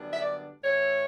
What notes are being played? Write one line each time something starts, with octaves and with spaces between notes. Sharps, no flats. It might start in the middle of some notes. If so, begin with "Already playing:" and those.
Already playing: F#2 D3 G3 B3 D4
E5
D5
A2 E3 A3 C#5